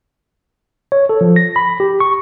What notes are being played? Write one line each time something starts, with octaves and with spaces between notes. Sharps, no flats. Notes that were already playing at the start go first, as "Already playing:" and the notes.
C#5
A4
F3
A#6
B5
G4
C#6